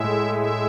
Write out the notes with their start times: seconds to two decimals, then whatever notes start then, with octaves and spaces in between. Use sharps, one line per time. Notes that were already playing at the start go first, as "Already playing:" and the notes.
Already playing: A2 G#3 E5
0.35 E5